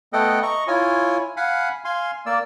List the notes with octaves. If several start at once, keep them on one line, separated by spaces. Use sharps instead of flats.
A3 B3 A4 D#5 F#5 G5
D#5 A#5 C#6
E4 F4 C#5 G#5
F5 F#5 G#5 B5
F5 G#5 C6
A#3 D5 E6